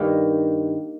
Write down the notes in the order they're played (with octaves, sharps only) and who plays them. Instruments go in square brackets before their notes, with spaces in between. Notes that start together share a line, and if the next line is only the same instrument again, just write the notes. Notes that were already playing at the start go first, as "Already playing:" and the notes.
Already playing: [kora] G2 D#3 A#3 D#4